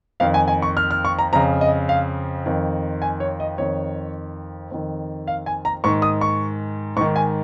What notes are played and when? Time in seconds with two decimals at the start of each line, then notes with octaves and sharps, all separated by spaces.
0.20 F2 D#3 F5
0.34 G#5
0.48 G#5
0.62 C#6
0.77 F6
0.91 F6
1.05 C#6
1.19 A#5
1.33 F2 C#3 A#5
1.61 D#5
1.89 F5
2.46 F2 D#3
3.02 G#5
3.20 C#5
3.40 D#5
3.58 F2 D#3 C#5
4.71 F2 D#3
5.27 F5
5.46 G#5
5.65 A#5
5.84 G#2 D#3 C#6
6.02 D#6
6.21 C#6
6.97 G#2 C#6
7.01 D#3
7.16 G#5